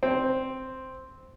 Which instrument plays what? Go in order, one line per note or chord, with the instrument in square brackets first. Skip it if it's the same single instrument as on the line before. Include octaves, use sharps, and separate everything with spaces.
[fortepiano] C4